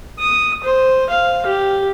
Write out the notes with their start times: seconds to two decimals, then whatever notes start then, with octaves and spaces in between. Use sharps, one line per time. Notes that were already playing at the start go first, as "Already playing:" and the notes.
0.20 D#6
0.64 C5
1.09 F5
1.47 G4